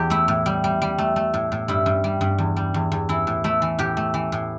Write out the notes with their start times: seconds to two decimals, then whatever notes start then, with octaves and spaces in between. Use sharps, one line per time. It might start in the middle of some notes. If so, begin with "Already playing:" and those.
Already playing: E2 G4
0.10 A3 E4
0.28 A2
0.46 G3
0.64 G3
0.82 G3
0.98 A3
1.16 A3
1.34 A2
1.52 A2
1.68 G2 E4
1.86 G2
2.04 G3
2.21 G2
2.38 E2
2.56 G3
2.74 E2
2.92 E2
3.09 E3 E4
3.27 A2
3.44 A3 E4
3.62 E3
3.79 A2 G4
3.97 A3
4.14 E3
4.32 A2